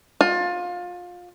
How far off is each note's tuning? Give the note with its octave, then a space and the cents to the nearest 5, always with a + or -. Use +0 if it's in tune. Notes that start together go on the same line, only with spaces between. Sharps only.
F4 +25